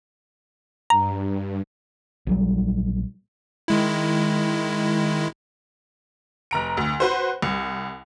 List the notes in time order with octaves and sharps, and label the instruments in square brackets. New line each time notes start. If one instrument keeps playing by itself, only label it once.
[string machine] G2 [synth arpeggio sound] A#5
[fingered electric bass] A#1 F#3 G3
[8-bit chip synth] D#3 G#3 E4
[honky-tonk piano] F1 A#5 D7
D2
F#4 B4 C5
C2